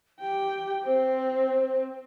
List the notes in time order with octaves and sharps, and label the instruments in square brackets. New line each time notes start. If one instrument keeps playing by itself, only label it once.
[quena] G4 [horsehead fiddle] G5
[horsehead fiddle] C4 [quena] C5